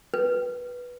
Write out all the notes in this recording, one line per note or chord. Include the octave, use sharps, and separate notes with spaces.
B4